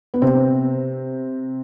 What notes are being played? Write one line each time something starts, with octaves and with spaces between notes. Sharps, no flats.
B3
C3 C4